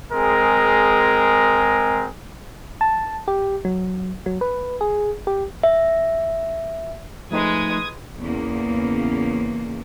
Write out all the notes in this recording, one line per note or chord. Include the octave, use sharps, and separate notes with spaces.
G#3 C4 G#4 A#4
A5
G4
F#3
F#3
B4
G#4
G4
E5
F3 G#3 A3 D#4 B4 D#6 G#6
E2 C#3 A#3